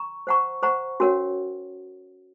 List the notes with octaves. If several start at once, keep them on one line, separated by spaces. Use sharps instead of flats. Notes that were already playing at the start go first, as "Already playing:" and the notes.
Already playing: A#5 C#6
C5 F#5 A#5 C#6
C5 F#5 A#5 C#6
C#4 F#4 A#4 C#5 F#5